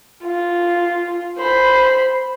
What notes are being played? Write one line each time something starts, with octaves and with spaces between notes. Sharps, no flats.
F4
C5 B5